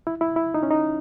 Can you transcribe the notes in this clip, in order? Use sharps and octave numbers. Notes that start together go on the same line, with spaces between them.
E4
E4
E4
D#4
C#4
D#4